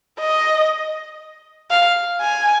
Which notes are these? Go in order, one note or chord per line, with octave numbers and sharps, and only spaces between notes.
D#5
F5
G#5